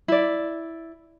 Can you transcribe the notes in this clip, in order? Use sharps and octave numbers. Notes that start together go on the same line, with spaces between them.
E4 D5